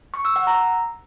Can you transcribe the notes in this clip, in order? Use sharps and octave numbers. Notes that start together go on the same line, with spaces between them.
C#6
E6
F#5
A#5